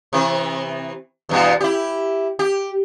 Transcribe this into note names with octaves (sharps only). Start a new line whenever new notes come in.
C3 E3
E2 G2 B2
E4 G4
G4